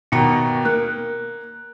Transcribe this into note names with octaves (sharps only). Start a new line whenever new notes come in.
D#2 B2 A#5 C#7
A#3 F#6